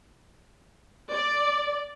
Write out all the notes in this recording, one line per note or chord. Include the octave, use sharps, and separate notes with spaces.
D5